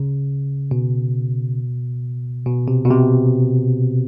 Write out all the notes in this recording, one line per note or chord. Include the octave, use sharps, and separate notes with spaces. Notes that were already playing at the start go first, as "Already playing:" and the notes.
Already playing: C#3
B2
B2
C3
B2
C3